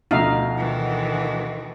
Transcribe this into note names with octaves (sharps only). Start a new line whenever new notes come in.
D2 B2 F3 D#4 E5 F5
D#3 E3